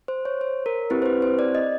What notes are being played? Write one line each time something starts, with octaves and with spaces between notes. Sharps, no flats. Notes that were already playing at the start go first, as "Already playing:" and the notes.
C5
C#5
C5
A#4
C4 E4 G4 B4
C5
B4
C5
D5
D#5